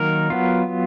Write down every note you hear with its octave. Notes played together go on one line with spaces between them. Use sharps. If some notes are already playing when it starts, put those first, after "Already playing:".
Already playing: D#3 F#3 A#3 D#4 A#4
F#3 B3 F4